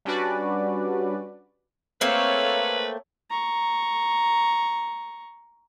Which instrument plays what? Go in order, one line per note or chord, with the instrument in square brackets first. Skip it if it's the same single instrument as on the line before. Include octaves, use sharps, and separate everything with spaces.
[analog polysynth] G3 C#4 D4 F#4 B4 D5
[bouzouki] A3 A#3 C4 [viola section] A4 C#5 [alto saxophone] B4 [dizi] F5
[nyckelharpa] A#5 C#6